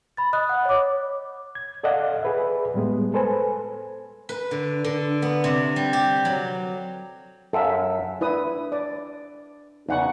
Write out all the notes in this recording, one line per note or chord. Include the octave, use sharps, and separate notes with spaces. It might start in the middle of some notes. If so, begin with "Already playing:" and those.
B5 A6
D#5 B5 D#6 F#6
F#5
C#5 D6
G#6
A4 D5 D#5 F5 F#5
G#4 B4 E5
A2 G3 G#3 B3
A4 B4 C5 G#5
B4
D3
D3
B3
C3
G3
G4
F#3
F#2 A4 E5 F5 A#5
D4 E4 B4 D#6
D5
E2 C#3 D#4 F#5 C#6